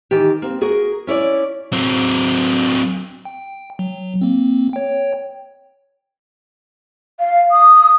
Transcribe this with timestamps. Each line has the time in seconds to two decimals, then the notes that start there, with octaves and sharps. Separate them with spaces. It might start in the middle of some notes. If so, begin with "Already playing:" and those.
0.11 D#3 E3 G4
0.42 A#3 C4
0.61 F#4 G#4 A#4
1.07 C#4 E4 C#5 D5
1.73 F#3 C4
3.25 G5
3.79 F#3
4.21 A#3 C4
4.73 C#5 G5
7.19 F5
7.51 D#6